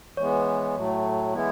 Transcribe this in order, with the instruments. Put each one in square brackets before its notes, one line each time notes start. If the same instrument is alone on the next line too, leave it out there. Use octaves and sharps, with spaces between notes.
[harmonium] E3 G#3 B3 [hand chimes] C#5
[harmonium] A2 F#3 A3
E3 G#3 B3 E4